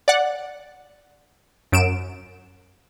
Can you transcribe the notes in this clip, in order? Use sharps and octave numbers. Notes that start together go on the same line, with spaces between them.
D5 F#5
F#2 D7 E7